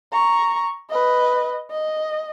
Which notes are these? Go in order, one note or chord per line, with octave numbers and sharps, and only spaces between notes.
A#5 C#6
B4 D#5
D#5